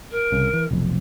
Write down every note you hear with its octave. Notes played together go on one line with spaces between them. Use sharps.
A#4
C2 C#3
E3
F1 B1 F2